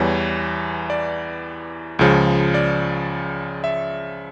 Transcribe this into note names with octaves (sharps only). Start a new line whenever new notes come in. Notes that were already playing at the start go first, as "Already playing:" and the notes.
Already playing: E2 E3 G3 C#5
D5
C#2 C#3 F3
D5
E5